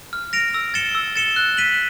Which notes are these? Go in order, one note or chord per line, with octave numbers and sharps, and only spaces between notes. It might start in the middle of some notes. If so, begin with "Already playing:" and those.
F6
A#6 D7 F7
E6
A6 C#7 E7 G7
E6
A6 C#7 E7 G7
F#6
B6 D#7 F#7